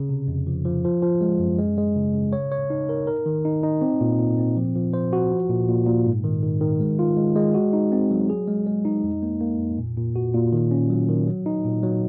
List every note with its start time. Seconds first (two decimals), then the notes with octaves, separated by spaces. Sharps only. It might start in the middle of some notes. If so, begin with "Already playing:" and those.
Already playing: C#3
0.09 C3
0.28 F2
0.47 F3
0.65 F3
0.85 F3
1.03 F3
1.21 G#3
1.39 F#2
1.58 G#3
1.77 G#3
1.96 C#3
2.14 C#3
2.33 C#5
2.52 C#5
2.70 D#4
2.89 A#4
3.07 A#4
3.26 D#3
3.45 D#4
3.63 D#4
3.82 C4
4.01 A#2
4.19 A#2
4.38 C4
4.56 F3
4.75 F3
4.93 C5
5.13 F#4
5.31 F3
5.50 A#2
5.68 A#2
5.87 A#2
6.06 G#2
6.24 D#3
6.43 D#3
6.61 D#3
6.80 G#3
6.99 F4
7.17 G#3
7.36 G#3
7.54 F#4
7.73 D#4
7.92 C4
8.11 F#3
8.29 G#4
8.48 G#3
8.66 G#3
8.85 D#4
9.04 F2
9.23 A#3
9.41 A#3
9.59 F2
9.78 A#2
9.97 A#2
10.16 F#4
10.34 A#2
10.53 D#3
10.71 C#4
10.90 F#3
11.09 D#3
11.27 F#3
11.46 D#4
11.64 A#2
11.83 F#3